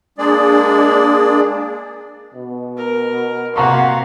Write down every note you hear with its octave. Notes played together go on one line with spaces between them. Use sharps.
G#3 A#3 D4 G#4 D5
B2
A#4
C3 A#3 F#4 F#5 A#5 C6 C#6